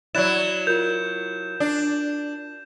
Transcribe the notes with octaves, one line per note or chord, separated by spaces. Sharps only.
F#3 E4 D5 F#6 A6 E7
F4 A#4 G6
D4